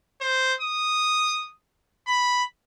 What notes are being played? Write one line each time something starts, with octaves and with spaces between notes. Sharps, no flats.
C5
D#6
B5